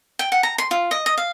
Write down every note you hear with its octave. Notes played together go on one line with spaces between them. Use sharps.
G5
F#5
A#5
C6
F4
D#5
D#5
F5